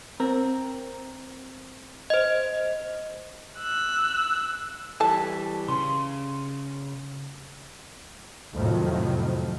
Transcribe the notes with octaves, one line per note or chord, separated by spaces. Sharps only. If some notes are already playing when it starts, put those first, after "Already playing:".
C4 A#4
C5 D#5
E6 F#6
E3 G3 A4 E5 A5
C#3 C#4 C6
F2 A2 C3 D#3 F3 F#3